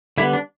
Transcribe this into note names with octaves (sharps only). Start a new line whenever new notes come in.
D3 G3 B3 E4
D4